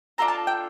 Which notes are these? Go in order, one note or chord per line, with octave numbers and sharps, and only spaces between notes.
D4 F4 A4 A#5
A5
G5